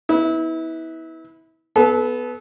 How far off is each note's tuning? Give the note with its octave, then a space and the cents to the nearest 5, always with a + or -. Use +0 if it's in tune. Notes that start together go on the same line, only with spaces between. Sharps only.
B3 +0 E4 -30
B3 +0 A4 -30